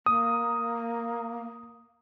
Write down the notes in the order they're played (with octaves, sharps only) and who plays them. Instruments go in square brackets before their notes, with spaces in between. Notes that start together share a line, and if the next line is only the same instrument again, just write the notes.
[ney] A#3 [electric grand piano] D#6